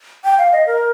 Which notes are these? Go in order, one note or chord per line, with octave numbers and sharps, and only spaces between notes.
G5
F5
D#5
A#4